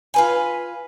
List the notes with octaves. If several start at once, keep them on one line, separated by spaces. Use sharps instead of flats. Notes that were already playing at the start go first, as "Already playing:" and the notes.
F4 B4 G#5